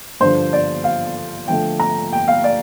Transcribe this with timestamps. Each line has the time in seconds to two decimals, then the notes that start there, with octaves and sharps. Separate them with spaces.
0.20 G2 D3 F3 C5
0.53 D5
0.84 F5
1.48 D3 F3 A3 G5
1.80 A#5
2.13 G5
2.28 F5
2.44 D5